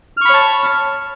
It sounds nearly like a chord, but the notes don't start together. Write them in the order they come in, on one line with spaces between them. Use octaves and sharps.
F6 C#6 B5 C#5 A5